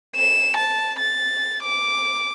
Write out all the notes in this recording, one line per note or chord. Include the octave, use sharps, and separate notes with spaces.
E7
A5
A6
D6